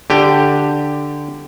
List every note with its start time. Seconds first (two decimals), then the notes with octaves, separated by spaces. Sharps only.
0.10 D3 G4